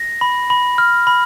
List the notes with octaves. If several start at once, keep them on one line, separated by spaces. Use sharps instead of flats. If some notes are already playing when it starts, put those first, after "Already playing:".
Already playing: A#6
B5
B5
F6
B5